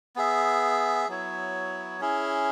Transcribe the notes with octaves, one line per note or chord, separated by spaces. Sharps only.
B3 G#4 E5
F#3 B3 E4 C#5
C#4 E4 G#4